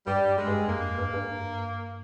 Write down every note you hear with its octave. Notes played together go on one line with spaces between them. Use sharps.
G2 G3
G#3
G2
F2 A#3
G2
G2
G2